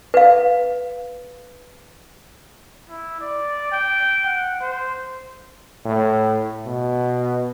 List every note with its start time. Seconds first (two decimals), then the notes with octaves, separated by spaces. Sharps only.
0.14 B4 F5
2.90 E4
3.21 D5
3.72 G5
4.26 F#5
4.61 C5
5.85 A2
6.66 B2